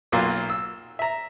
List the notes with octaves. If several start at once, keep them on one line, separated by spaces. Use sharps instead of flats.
B1 F#3 A#3 F4 C6
E6
E5 A#5